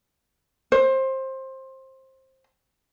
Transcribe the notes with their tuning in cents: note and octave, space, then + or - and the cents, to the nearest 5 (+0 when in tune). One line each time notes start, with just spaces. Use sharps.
C5 +20